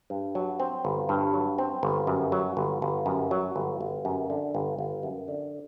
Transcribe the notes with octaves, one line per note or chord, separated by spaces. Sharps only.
G2
F#3
C4
G1
G2
F#3
C4
G1
F#2
F#3
G1
G1
F#2
F#3
G1
G1
F#2
D3
G1
G1
F#2
D3